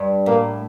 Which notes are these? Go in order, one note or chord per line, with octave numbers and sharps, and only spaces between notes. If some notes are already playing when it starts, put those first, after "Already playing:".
Already playing: G2
A2 A#3